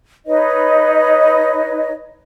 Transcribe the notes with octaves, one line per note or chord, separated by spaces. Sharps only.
D#4 B4 C#5 D#5